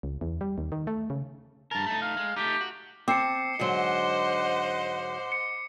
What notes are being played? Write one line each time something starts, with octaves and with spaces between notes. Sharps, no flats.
C#2
E2
G3
D#2
D#3
A3
C#3
G2 A#4 A5
A3 D#4
F5
G#3
A3 D#4 G4
F#4
C4 A5 D6 C7 C#7
G#2 D3 F#3 C5 D#5 F#5
C#7